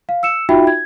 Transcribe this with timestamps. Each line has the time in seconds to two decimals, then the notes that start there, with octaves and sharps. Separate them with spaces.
0.09 F5
0.23 E6 C#7 E7
0.49 D#4 F4 F#4 E5 G5 B5
0.67 G#6